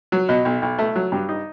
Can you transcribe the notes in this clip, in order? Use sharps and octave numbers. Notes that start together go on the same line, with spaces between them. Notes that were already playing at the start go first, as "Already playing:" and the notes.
F#3
B2
B1
B1
A3
F#3
G2
D#4